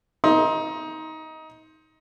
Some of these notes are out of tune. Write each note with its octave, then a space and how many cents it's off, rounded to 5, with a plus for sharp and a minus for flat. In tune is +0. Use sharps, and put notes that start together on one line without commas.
D#4 +20 C6 +10